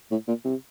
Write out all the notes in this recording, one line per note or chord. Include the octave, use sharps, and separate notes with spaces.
A2
A#2
C3